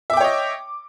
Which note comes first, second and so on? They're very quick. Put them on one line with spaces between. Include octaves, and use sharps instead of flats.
E5 D6 G5 C#5 D#5